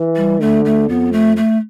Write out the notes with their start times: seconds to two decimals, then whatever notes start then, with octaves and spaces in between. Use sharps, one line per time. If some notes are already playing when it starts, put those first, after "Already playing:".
Already playing: E3
0.17 G3
0.40 D3 A3
0.65 A3
0.89 F2 B3
1.13 A3
1.37 A3